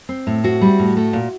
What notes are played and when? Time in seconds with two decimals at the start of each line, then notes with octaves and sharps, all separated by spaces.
0.09 C4
0.27 A2
0.43 C4 F#4
0.61 G3
0.79 A2
0.97 A3
1.13 A#2